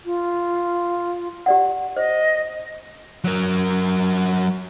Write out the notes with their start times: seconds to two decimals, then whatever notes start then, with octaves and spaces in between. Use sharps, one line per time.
0.05 F4
1.46 G4 D5 F#5
1.97 C5 D#5
3.24 F#3 A#4